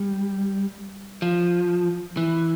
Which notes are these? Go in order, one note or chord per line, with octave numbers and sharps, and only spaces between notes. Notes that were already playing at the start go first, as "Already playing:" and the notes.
Already playing: G3
F3
E3